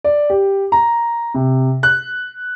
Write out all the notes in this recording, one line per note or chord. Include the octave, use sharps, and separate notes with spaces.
D5
G4
A#5
C3
F#6